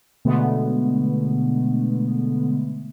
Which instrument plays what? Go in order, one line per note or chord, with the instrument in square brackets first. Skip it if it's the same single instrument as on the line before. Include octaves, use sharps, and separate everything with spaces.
[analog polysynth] B2 D3 G#3 A3 B3